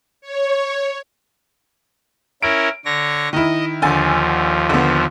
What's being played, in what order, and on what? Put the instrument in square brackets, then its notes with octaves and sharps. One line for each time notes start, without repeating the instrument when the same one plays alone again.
[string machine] C#5
[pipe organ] C#4 E4 A#4 [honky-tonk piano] D7
[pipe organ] D3 C#5 A#6
[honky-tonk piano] D#3 E4 [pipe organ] D#5
[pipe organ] D#2 F3 [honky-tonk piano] D3 G#5 A6
[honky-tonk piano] D3 B3